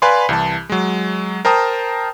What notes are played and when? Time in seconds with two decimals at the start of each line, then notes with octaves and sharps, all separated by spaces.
0.02 B4 D5 F5 G#5 B5 C6
0.29 C2 E3 A5
0.69 F#3 G#3
1.45 A#4 C5 G5 A5 A#5 D#6